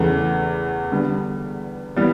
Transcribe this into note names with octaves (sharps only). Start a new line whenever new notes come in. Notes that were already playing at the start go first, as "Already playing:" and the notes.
Already playing: E2 C#3 E3 A3
D3 G3 B3
E3 G3 B3